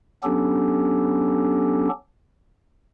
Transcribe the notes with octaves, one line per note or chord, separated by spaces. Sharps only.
F#3 B3 C#4 D4 G4 A4